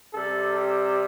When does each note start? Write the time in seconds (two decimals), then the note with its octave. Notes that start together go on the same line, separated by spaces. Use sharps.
0.14 C3 G3 A4
0.56 G4